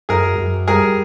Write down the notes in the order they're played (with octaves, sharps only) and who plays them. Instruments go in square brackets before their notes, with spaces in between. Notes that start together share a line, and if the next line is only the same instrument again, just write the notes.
[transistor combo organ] F#2 [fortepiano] G#4 A#4
[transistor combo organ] F#2
[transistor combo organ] G3 [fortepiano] G#4 A#4